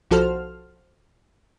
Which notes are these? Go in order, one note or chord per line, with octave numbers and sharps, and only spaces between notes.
B1 F3 F#4 A4 C5 F6